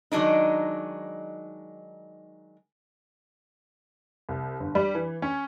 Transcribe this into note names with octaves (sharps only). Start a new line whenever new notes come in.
D#3 F#3 G#3 D4 D#4
C2
G1
G3
E3
C#4